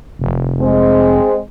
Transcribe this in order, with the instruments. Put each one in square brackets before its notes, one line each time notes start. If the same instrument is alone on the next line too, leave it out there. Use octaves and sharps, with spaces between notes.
[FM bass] F1
[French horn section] G#3 C4